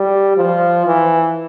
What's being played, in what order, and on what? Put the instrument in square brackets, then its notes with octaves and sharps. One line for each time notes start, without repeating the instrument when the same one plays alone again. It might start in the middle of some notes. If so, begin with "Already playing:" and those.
Already playing: [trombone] G3
F3
E3